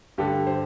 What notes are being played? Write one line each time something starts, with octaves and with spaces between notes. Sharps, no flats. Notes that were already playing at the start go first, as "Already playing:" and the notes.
G2 D3 G4
C5